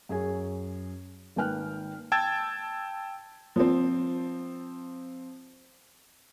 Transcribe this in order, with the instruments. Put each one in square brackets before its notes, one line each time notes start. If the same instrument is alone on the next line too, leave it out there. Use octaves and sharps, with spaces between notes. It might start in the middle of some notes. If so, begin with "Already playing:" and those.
[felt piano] F#2 G#4 C#5 G#5
G#1 A#3 B4 G5 F6 F#6
[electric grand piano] G5 A5 E6 G#6 A6
[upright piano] F3 C4